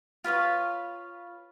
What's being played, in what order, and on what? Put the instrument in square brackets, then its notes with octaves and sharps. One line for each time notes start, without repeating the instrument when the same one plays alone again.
[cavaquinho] F4 B4 C#5 F5